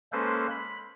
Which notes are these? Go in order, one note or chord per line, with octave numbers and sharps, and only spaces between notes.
G#3 A#3 C#4 A4 B4 C5
B5